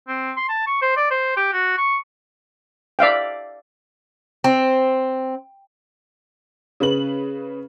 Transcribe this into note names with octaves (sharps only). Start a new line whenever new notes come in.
C4
C6
A5
C#6
C5
D5
C5
G4
F#4
C#6
D5 E5 F5 G5
C4
C#3 B4 F#7